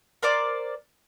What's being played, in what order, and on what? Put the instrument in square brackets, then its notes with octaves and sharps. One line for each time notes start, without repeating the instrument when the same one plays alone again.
[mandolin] A#4 C5 D5 D6